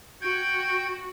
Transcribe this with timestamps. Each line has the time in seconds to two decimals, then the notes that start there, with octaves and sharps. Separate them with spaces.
0.21 F#4 G5 G6 G#6